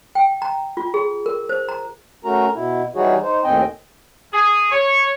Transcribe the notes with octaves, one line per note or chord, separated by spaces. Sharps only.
G5
A#5
F4
G#4
A#4
C5
A#5
A3 C#4 F#4 A#4 A#5
B2 E4
E3 G3 D#4 F#4 G#4 C#5
D#4 C5
D#2 A2 C4 D#5 G5 G#5
G#4
C#5